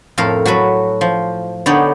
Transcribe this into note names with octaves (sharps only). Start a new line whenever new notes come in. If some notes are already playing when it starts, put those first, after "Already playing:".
F2 A2 A4 A#4 F5
F#3 F#4 A4 B4
F3
D3 B3 D#4 G4 C#5 D5